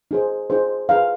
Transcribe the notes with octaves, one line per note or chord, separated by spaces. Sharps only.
D#4 G#4 C5
D#4 G#4 C5
D#4 G#4 B4 F5